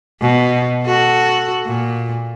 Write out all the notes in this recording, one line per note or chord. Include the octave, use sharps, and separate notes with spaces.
B2
F#4 A4
A#2